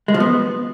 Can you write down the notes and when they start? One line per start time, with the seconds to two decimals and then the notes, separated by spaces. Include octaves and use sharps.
0.08 G#3
0.14 F3
0.20 B3